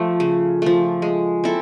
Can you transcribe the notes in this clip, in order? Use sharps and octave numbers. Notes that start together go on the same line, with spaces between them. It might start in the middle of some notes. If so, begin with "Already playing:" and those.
Already playing: F3 A3
C#3
F3 A3
G#3
C4 E4 A4